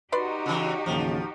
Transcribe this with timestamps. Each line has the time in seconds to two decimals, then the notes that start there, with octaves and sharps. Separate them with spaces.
0.12 D#4 F#4 G4 B4 D5 C6
0.46 C#3 E3
0.86 A1 D#2 C#3 F3